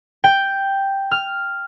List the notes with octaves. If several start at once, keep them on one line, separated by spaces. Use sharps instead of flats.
G5
F6